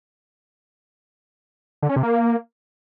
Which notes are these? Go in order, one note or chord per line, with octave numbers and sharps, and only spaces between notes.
D3
C#4
C3
A#3